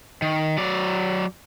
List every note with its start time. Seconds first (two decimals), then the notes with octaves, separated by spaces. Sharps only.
0.22 D#3
0.58 F#3 D5